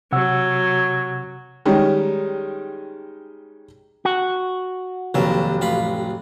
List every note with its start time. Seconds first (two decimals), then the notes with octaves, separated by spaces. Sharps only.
0.12 C3 F#3 F#5 E6
1.66 D#3 G3 G#3 C#4
4.05 F#4
5.14 F1 D#2 F#3 G4 A4
5.61 A1 F4 B5